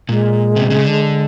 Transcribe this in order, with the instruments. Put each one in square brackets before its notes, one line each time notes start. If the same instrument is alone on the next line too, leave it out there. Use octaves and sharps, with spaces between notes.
[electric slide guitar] A#2 [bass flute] G#3
[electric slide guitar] C3
C#3
D3